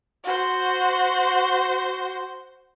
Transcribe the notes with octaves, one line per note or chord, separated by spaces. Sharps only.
F#4 C5